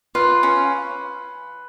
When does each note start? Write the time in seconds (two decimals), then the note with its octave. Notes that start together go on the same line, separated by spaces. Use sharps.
0.15 F4 B4
0.43 C#4